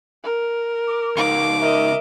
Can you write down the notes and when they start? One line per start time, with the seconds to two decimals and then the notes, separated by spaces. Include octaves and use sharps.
0.23 A#4
0.87 D6
1.17 C#2 D#4 F5 D6
1.61 A#4 D#5 E5